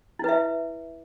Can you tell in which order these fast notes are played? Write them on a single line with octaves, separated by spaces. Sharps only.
E4 B4 E5